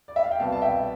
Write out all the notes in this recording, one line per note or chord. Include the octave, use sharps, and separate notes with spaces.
D5
E5
F5
G5
C2 B2 B3 F5 A5
A5
E5 G5